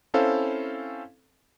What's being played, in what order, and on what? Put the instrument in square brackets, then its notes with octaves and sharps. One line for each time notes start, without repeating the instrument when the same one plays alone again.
[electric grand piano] C4 C#4 E4 A4 C5 F5